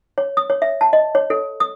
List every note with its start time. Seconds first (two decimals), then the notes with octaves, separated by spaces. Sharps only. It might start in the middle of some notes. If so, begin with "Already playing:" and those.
0.18 C#5
0.37 D#6
0.50 C#5
0.62 E5
0.81 A5
0.93 D#5
1.15 C#5
1.30 A4
1.60 D#6